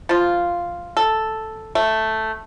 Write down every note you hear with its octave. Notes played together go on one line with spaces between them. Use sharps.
F3 F4
A4
A3